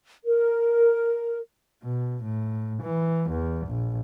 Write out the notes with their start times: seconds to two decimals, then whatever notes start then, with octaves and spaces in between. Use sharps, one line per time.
0.25 A#4
1.83 B2
2.23 A2
2.82 E3
3.30 E2
3.67 A#1